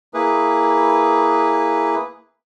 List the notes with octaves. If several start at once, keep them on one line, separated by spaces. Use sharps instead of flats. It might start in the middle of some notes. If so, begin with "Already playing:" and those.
A#3 E4 G#4 B4